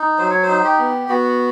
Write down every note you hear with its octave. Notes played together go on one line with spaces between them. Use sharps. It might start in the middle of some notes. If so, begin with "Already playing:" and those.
Already playing: D#4
F#3 C5
C#5
C5
D#4
G4
B3
B3 F#4